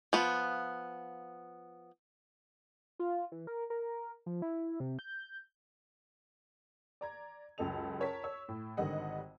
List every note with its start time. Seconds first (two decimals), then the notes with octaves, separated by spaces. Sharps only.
0.13 F3 B3 F4
2.99 F4
3.32 E3
3.47 A#4
3.70 A#4
4.26 F3
4.42 E4
4.80 C3
4.99 G6
7.01 D5 A#5 G#6
7.58 C#2 F#2 A4 D#5 F7
8.00 A#4 C#5 A5 B6
8.24 C#5 E6
8.48 A2
8.77 G#1 D3 D#3 G3 D#5 F#5